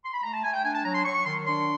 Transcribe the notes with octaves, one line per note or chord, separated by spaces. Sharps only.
C6
B5
A3 A#5
A5
A3 G#5
G5
D4 G#5
A5
F#3 A#5
C6
F#3 C#6
C#6
D#3 C6
D4 C6